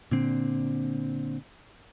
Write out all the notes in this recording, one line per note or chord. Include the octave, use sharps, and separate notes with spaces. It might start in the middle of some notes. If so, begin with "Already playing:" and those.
A#2 D3 C4